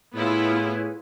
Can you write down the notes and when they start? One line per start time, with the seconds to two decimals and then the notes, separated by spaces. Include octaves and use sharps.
0.15 A2 B3 E4 F4 G#4 B4 C#5